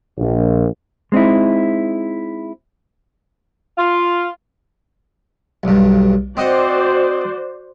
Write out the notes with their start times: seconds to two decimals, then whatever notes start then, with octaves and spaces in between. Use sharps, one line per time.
0.18 A#1
1.12 G#3 C4 D#4 E4
3.78 F4
5.64 B1 G2
6.37 C4 F#4 C5 D5 D#5 F#5